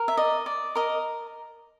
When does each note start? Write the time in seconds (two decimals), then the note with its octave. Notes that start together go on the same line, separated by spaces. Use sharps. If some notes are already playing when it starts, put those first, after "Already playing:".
Already playing: A#4
0.08 E5
0.17 D5 D#5
0.46 D5
0.75 A#4 D#5